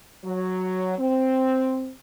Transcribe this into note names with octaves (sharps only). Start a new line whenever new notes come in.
F#3
C4